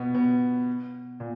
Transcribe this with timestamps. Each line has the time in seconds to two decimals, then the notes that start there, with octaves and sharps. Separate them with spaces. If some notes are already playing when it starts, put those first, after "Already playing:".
Already playing: B2 B3
0.14 B2 B3
1.20 A#2